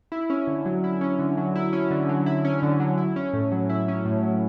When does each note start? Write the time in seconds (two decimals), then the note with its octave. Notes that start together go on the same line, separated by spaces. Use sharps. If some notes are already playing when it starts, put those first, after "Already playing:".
0.12 E4
0.30 C#4
0.47 D3
0.65 F#3
0.84 E4
1.01 C#4
1.19 D3
1.37 F#3
1.55 E4
1.73 C#4
1.91 D3
2.09 F#3
2.26 E4
2.45 C#4
2.63 D3
2.80 F#3
2.98 E4
3.16 C#4
3.33 A2
3.52 F#3
3.70 E4
3.88 C#4
4.05 A2
4.23 F#3